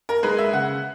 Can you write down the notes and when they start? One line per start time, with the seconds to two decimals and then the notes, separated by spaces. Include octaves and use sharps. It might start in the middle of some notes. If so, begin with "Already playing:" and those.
0.09 A#4
0.23 G#3 B4
0.38 E5
0.53 C#3 F#5